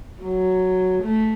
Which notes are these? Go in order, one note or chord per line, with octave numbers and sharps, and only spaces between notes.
F#3
A3